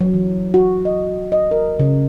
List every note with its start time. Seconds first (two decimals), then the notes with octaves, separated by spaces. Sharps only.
0.01 F#3
0.14 E3
0.54 F#4
0.85 D#5
1.32 D#5
1.51 A#4
1.79 C#3